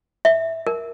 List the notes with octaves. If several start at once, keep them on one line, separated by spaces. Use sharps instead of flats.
E5
A#4